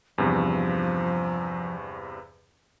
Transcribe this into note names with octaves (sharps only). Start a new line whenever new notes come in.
E2 G2 C3 F3